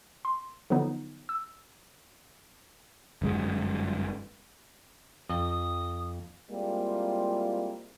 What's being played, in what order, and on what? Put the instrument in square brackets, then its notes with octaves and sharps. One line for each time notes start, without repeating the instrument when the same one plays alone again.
[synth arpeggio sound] C6
D3 F3 F#3 B3 D#4
E6
[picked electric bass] G1 F#2 G#3
[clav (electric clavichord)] F2 [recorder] D#6
[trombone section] G3 G#3 A#3 C4 E4 F4